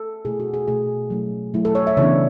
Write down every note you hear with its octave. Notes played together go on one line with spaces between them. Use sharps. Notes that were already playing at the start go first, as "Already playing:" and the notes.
Already playing: A4
B2 A3 E4 G#4
F#4
G#4
B2 A3 E4 G#4
F#3 A3 E4
F#3 A3 E4
A4
C#5
E5
C#3 E3 B3 D4 C#5